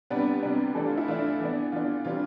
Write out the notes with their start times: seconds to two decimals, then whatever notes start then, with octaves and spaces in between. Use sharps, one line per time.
0.10 C3 G3 B3 D4 B4
0.43 C3 G3 B3 D4
0.75 E3 A3 D4 A4
0.87 F4
0.98 E4
1.08 E3 A3 D4 F4
1.40 E3 B3 D4
1.72 E3 B3 D4 F4
2.05 C3 E3 G3 D4 F4